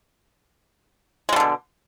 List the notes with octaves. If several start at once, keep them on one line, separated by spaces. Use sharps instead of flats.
B2 D3 G3 G#3